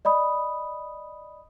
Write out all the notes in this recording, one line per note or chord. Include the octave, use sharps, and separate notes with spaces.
D5 D#5 B5 D#6